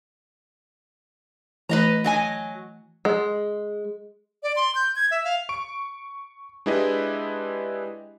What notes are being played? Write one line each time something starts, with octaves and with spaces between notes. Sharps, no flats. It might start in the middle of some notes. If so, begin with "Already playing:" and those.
E3 A3 E4 B4 D#5 A#5
F#3 D#5 G#5
G#3
D5
C6
G6
G#6
E5
F5
C#6 D7
G#3 D4 E4 G4 B4 D#5